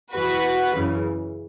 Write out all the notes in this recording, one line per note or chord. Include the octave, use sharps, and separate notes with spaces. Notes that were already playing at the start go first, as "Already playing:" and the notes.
E2 E3 F#4 B4
F#2 C#3 E3